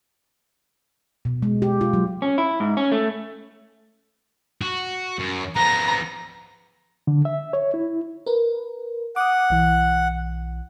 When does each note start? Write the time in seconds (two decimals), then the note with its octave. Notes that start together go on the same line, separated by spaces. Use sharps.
1.25 B2
1.42 G#3
1.62 G4
1.81 F4
1.93 F#3
2.22 C#4
2.38 E4
2.60 G#2
2.77 C#4
2.92 A3
4.62 F#4
5.19 F#2
5.56 F3 B3 A#5
7.07 D3
7.25 E5
7.53 C#5
7.74 E4
8.26 A#4 B4
9.16 F#5 D6 D#6
9.50 B1 E3